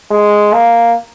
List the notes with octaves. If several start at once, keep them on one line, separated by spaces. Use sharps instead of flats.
G#3
A#3